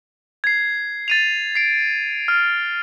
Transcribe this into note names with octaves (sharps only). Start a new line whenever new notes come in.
G#6 C7
A6 D#7 F7
C7 D7
F6